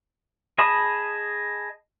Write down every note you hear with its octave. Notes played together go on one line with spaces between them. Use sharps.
G#4 D#5 A5 B5 D#6